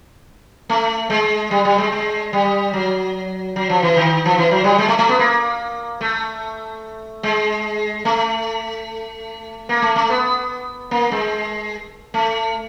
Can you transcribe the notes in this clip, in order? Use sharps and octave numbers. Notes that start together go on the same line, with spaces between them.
A3
G#3
G3
G3
G#3
G#3
G3
F#3
F#3
F3
E3
D#3
F3
E3
F#3
G3
G#3
A3
A3
B3
A#3
A3
G#3
A3
A#3
A3
A3
B3
A#3
G#3
A3